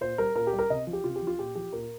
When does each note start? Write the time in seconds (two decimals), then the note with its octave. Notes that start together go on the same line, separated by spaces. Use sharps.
0.01 A#2 C5
0.18 G3 A#4
0.35 A#2 A#4
0.47 G4
0.53 G3
0.59 A#4
0.70 C3 D#5
0.87 F3
0.93 G4
1.04 C3 F4
1.16 G4
1.22 F3
1.27 F4
1.39 A#2 G4
1.55 F3 G4
1.72 A#2 A#4